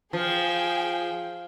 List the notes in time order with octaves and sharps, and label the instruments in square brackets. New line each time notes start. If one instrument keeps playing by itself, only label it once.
[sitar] F3 [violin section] G#4 F5 G5